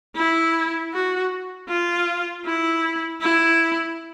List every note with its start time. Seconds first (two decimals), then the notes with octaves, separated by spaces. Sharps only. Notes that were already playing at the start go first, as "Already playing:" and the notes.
0.17 E4
0.93 F#4
1.69 F4
2.45 E4
3.21 E4